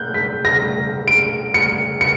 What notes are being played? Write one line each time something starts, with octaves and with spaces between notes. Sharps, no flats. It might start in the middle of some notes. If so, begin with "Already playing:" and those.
Already playing: F#6 G6
B6
A#6
D7
C#7
C#7